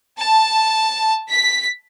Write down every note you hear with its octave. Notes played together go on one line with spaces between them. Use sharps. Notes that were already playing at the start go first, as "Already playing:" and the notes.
A5
B6